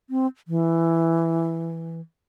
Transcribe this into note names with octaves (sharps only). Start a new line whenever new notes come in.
C4
E3